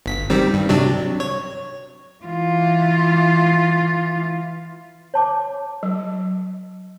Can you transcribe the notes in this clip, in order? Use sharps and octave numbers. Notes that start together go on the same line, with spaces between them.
G1 B6
D#3 G3 C4
G2
C3 F#3 D4
C#5
E3 F4
C#5 A5 D6
F#3